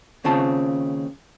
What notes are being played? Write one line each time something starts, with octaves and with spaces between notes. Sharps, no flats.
D#2 C#3 C4 F4 A5